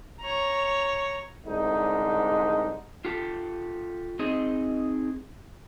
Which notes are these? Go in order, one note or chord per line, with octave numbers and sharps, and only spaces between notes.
C#5 A#5
C2 G#2 D3 D#4
F4 G4 A4
C4 D#4 G#4 D#5